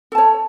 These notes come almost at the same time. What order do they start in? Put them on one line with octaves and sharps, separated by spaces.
A4 A5 C#5